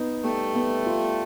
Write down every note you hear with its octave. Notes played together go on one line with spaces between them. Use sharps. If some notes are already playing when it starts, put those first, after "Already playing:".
Already playing: B3 D#4
G3 A3 B3
B3
F4